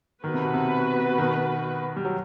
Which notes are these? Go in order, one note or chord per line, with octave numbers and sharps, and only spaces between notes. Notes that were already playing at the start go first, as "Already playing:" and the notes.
D#3 B3 F#4 B4
C3
B2
C3
B2 D#3
G3
F#3